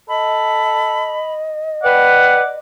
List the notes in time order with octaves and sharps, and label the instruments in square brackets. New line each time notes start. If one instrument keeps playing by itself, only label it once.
[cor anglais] A4 [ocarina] D#5 [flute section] B5
[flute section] B4 G5 [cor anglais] D5 [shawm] F#5